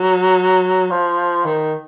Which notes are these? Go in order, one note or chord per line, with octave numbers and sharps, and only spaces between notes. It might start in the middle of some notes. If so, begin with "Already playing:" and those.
Already playing: F#3
F3
D#3